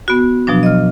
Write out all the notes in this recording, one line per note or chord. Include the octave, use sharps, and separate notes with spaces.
B3 F#4
B2 F3 F#3 D4
D#5 F6